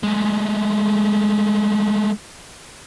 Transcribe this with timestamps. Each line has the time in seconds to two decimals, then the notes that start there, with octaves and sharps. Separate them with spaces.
0.03 G#3 A3